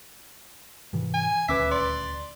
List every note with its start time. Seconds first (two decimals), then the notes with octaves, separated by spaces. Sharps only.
0.93 G#2 C3 E3
1.14 G#5
1.49 D#1 D2 C#4 B4 E5 D6 E6
1.72 D5 C6